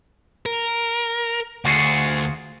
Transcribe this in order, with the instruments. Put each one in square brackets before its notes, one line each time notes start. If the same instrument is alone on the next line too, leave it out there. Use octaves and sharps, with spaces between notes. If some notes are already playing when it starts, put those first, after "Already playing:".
[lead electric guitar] A#4
[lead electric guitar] D2 [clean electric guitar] F4 F#4 G#4